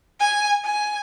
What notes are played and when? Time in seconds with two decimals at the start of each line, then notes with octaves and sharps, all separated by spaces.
0.20 G#5
0.65 G#5